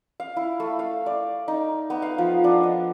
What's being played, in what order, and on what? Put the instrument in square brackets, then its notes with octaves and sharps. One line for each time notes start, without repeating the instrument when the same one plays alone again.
[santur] F5
E4
A3
F5
D5
D#4
B3
F5
F3
D4
D#5